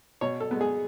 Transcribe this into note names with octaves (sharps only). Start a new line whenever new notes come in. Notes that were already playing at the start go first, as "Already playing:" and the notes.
B2 C#5
A4
G#3 B3
G#4